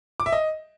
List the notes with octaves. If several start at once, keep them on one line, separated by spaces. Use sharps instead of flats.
D6
E5
D#5